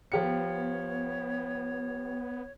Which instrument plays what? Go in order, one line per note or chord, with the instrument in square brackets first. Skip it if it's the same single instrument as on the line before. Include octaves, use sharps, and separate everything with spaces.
[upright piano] F3 G4 C#7 [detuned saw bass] B3 [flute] C#5